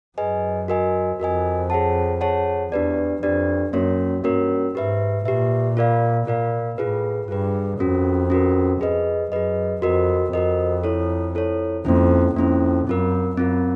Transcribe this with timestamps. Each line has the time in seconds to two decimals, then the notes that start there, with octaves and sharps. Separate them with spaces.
0.18 F#2 G#4 B4 D#5 G#5
0.68 F#4 A#4 D#5 G#5
1.19 F2 F#4 A#4 D#5 G#5
1.70 G#4 C#5 F#5 A5
2.21 G#4 C#5 F#5 A5
2.71 E2 D4 G4 B4 D5
3.23 F2 D4 G4 B4 D5
3.73 F#2 A#3 C#4 F#4 A#4 C#5
4.24 G2 A#3 C#4 F#4 A#4 C#5
4.75 G#2 G4 B4 E5
5.25 A#2 G4 B4 E5
5.77 F4 A#4 D5 F5
6.27 A#2 F4 A#4 D5 F5
6.78 A2 F4 G#4 B4
7.28 G2 F4 G#4 B4
7.79 F2 C#4 F#4 A#4
8.30 C#4 F#4 A#4
8.81 F2 G#4 B4 D#5
9.31 F#2 G#4 B4 D#5
9.82 F2 F#4 A#4 D#5
10.33 F2 F#4 A#4 D#5
10.84 E4 A4 C#5
11.35 E4 A4 C#5
11.85 F2 A#3 C#4 E4
12.36 F2 A#3 C#4 E4
12.87 F#2 C4 F4 A#4
13.37 F#2 C4 F4 A#4